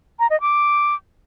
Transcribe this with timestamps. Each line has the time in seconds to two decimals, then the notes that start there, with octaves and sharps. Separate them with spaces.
0.19 A#5
0.30 D#5
0.41 D6